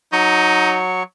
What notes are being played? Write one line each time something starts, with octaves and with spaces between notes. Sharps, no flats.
F#3 D#4 C#6